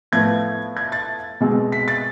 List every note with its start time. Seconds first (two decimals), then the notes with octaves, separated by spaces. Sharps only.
0.12 A2 F3 B3 G#6
0.77 G#6
0.92 A6
1.41 B2 G#3 C4
1.72 B6
1.88 A6